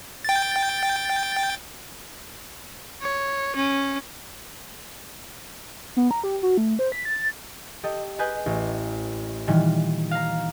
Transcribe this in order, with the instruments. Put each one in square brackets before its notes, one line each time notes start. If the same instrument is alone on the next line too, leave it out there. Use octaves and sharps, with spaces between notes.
[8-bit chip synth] G5 A6
[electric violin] C#5
C#4
[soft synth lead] B3
A#5
G4
F#4
A3
C5
B6
A6
[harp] G4 A4 D#5
G#4 B4 D#5 G#5 G6
A1
A#2 D#3 E3 G3
F5 A#5